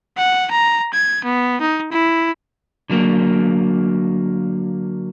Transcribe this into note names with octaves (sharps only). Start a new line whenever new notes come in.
F#5
A#5
G#6
B3
D#4
E4
D3 F#3 A#3